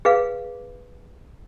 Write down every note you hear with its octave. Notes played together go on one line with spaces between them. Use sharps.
G#4 B4 F5